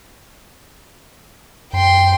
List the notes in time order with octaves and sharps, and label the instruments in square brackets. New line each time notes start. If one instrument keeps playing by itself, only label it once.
[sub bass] F#2 [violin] G5 C6